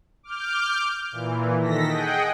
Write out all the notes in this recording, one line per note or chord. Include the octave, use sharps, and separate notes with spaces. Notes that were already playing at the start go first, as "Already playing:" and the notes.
D6 F6 G6
A#2 E3
D#3 A4 A#6 B6
G#4 D#5 F#5 G5